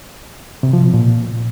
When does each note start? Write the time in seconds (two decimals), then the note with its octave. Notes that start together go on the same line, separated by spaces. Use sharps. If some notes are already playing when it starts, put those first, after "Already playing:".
0.63 C3
0.73 F3
0.83 B2
0.94 A#2